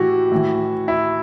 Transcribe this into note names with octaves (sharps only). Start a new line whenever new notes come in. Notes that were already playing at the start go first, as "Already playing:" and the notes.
Already playing: A2 E3 F#4 G4
A2 E3
E4